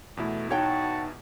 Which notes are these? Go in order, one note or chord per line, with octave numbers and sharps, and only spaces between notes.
E2 B2 A3 E4
D#4 F#4 C#5 G5 A5